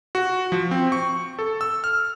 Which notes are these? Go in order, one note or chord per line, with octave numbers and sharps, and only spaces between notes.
F#4
F3
C4
C#6
A4
E6
F6